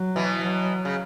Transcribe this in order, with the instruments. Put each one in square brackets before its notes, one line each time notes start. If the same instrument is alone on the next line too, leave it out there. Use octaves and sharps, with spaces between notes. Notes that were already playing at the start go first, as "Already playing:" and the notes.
Already playing: [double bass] F#3
[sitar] B2 E3
[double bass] F#3
[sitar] C#3